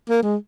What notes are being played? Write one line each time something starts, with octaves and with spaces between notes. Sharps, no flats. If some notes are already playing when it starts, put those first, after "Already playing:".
A#3
G#3